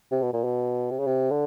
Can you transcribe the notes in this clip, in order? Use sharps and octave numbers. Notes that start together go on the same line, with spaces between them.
C3
B2
A#2
B2
C3
C#3
C3
D3